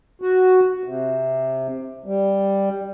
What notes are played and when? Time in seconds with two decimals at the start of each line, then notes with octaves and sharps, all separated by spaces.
0.22 F#4
0.84 C3
2.06 G3